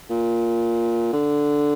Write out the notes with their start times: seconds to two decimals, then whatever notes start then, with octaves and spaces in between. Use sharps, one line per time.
0.10 A#2
1.13 D3